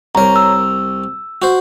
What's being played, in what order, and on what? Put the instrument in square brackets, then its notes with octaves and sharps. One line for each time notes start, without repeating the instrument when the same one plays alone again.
[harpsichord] C2 A#4 [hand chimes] C#5 A#5
[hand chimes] E6
[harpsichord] F#4 C5